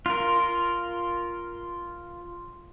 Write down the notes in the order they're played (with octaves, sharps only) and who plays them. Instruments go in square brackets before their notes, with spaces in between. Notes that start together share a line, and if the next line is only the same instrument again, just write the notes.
[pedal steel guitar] F4 A#4